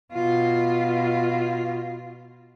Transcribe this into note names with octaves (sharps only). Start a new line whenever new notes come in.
B2 F4